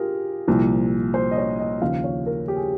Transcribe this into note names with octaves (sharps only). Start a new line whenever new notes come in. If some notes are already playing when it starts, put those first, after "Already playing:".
Already playing: F4 G4 G#4 A#4
C2 A#2 F3
C5
D#5
C#5
D#5
D#2 C#3 F3 F5
C#5
A#4
G4
G#4